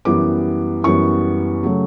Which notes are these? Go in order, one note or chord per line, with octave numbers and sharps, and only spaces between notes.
F#2 E3 G3 B3 D6
F#2 E3 G3 B3 C#6
C#3 F#3 A3